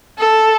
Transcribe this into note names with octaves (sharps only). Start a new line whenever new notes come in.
A4